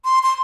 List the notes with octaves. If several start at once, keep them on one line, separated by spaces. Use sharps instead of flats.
C6
C6